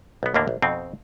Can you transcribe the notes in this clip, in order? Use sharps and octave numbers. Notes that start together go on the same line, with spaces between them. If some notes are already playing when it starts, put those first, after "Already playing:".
B1 B3
D#2 A2 D3 A#3 D4
A#1
F2 B2 C4 D#4